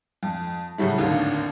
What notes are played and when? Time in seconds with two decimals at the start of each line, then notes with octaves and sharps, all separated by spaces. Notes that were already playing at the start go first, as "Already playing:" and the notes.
0.23 F2
0.78 A2 C#3 F#3 G3 A3
0.98 G#1 D#2 A2 D3 D#3 F5